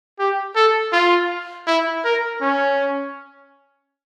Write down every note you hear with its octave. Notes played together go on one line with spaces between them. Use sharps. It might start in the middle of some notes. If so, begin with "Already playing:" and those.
G4
A4
F4
E4
A#4
C#4